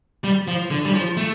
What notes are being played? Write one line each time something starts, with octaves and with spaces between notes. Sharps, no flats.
G3
F3
D3
G3
F3
A3